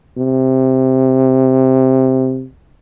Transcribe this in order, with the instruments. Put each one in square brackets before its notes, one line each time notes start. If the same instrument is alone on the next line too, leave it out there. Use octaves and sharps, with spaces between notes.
[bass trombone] C3